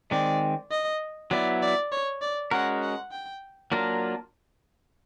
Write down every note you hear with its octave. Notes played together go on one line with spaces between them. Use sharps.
D#3 G#3 C4 D5
D#5
F#3 B3 E4 D5
D5
C#5
D5
G#3 C#4 F#4 A#4 F#5
F#5
G5
F#3 A#3 D4 F4 A#4